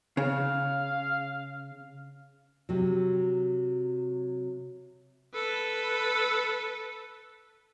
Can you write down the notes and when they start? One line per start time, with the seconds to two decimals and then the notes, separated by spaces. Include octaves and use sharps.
0.17 C#3 F5
2.69 C3 F#3
5.35 A4 B4